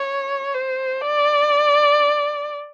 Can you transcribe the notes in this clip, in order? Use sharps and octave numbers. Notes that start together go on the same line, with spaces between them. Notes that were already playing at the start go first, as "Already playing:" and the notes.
Already playing: C#5
C5
D5